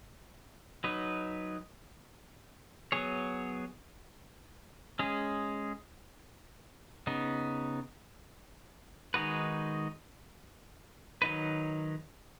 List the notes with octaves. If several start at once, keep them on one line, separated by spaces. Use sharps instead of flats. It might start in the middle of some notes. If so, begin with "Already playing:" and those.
F#3 D#4 B4
F#3 B3 G#4 C#5
G#3 C#4 G#4
C#3 B3 D#4
D#3 G#3 D#4 F#4 B4
D#3 F#3 D#4 B4